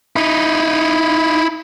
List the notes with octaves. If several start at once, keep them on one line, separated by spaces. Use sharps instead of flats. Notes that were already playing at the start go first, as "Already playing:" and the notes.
D#4 E4